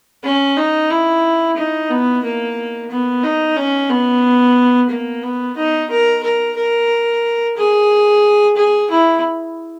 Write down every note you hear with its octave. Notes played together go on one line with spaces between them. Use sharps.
C#4
D#4
E4
D#4
B3
A#3
B3
D#4
C#4
B3
A#3
B3
D#4
A#4
A#4
A#4
G#4
G#4
E4